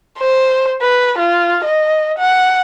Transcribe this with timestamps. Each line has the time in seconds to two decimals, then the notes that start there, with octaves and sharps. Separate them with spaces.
0.19 C5
0.82 B4
1.19 F4
1.64 D#5
2.18 F#5